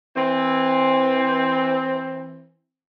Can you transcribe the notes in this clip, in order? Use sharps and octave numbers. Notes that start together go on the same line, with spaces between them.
E3 C4